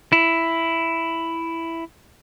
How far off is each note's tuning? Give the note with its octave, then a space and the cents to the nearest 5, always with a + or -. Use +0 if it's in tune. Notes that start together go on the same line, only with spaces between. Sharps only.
E4 +5